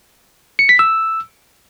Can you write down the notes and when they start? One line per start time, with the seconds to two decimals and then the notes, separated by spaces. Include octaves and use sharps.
0.59 C#7
0.69 B6
0.79 E6